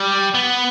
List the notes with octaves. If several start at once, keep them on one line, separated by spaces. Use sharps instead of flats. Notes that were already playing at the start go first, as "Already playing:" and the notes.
Already playing: G3
B3